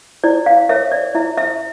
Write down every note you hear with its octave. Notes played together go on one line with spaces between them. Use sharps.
E4 D5
F5
A#4 C#5 E5
D5
E4 E5
E5